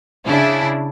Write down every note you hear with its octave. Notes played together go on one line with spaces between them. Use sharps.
C#3 D4 E4